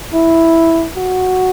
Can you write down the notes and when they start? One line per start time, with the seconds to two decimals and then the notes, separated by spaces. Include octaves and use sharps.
0.14 E4
0.97 F#4